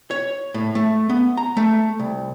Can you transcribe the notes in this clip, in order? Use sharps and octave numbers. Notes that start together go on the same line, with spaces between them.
C#5
A2
A3
B3
A#5
A3
C2